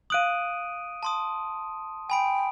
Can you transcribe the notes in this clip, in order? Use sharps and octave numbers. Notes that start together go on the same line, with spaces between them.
F5 D#6 F#6 D7 D#7 F#7
A5 C6 D#6
G5 G#5 B5 D7